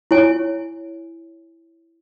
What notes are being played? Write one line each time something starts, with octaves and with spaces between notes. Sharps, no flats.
E4 C#5 G#5